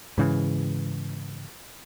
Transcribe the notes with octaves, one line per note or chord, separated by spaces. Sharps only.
G#2 C#3 E3